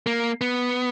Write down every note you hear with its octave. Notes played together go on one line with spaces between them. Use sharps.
A#3
B3